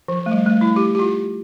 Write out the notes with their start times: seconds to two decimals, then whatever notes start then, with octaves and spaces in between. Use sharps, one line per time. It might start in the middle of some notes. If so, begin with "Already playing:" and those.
0.08 F3
0.26 A3
0.31 G3
0.46 A3
0.61 E4
0.76 G4
0.95 G4
0.99 F4